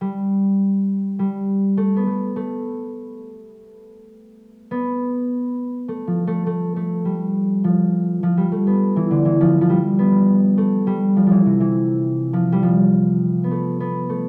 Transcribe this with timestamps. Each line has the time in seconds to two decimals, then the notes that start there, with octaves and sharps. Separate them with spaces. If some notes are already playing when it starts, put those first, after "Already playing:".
0.01 G3
1.19 G3
1.77 A3
1.96 B3
2.07 A3
2.36 A3
4.71 B3
5.88 A3
6.07 F3
6.27 A3
6.47 A3
6.76 A3
7.05 G3
7.64 F3
8.23 F3
8.37 G3
8.52 A3
8.67 B3
8.96 E3
9.10 D3
9.25 E3
9.41 F3
9.61 F3
9.69 G3
9.99 B3
10.57 A3
10.87 G3
11.16 F3
11.26 E3 F3
11.45 C3
11.60 E3
12.33 F3
12.52 G3
12.63 F3
13.44 B3
13.51 A3
13.80 B3
14.09 A3